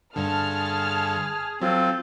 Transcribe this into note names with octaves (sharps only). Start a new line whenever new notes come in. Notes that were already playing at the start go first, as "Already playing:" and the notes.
G2 D3 G#4 A5 F6
F#3 C4 F4 A4